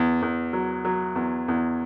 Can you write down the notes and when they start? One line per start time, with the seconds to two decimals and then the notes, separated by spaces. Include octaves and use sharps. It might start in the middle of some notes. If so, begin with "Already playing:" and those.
Already playing: E2
0.22 E2
0.53 F#3
0.85 F#3
1.16 E2
1.48 E2